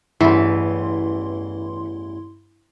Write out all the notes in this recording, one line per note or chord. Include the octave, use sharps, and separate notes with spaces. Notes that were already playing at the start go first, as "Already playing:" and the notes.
A1 E2 G2 E3 E4 C6